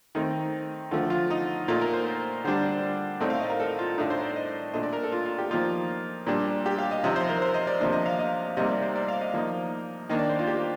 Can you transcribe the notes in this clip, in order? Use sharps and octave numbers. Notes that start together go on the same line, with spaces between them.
D#3 A3 C4 D#4
D3 F3 A3 F4
F4
D#4
A#2 A3 D#4 F4
A#4
C5
D3 G3 D4 C5
A2 A3 C4 D#4 D5
F5
D#5
A#4
A4
F4
A2 A3 D4 D#4
C5
D5
D#5
A#2 A3 D4 D#5
D5
A#4
A4
F4
F4
G4
F3 A#3 D#4 F4
A#2 G3 D4
G4
F5
D#5
C3 F3 C4 D#4 D#5
C5
A#4
C5
D#5
D5
C3 F3 A#3 D4 D#5
D#5
F5
D#5
C3 G3 A#3 D#4 D#5
D5
C5
D5
F5
D#5
F3 A#3 D#4
D#3 A#3 D4 D#5
D5
C5
F4
G4